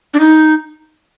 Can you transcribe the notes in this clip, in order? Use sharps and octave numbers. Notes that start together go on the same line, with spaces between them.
D4
D#4